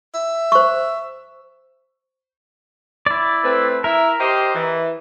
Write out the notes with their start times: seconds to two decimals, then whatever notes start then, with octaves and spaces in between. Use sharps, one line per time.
0.15 E5
0.52 C5 C#6
3.06 E4 D5
3.44 A3 C4 B4
3.84 E4 A#4 E5
4.20 G4 C5 D#5
4.55 E3